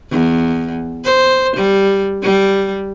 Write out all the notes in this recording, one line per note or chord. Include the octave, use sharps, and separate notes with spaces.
E2
C5
G3
G3